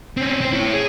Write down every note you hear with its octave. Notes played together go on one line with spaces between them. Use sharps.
C4 C#4
C4 C5
E4 C#5
G#4